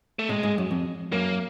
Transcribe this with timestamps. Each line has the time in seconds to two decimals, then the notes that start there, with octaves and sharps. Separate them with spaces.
0.19 A3
0.29 A2 G#3
0.43 G#2
0.58 F#2
0.71 F2
1.12 F#2 A#3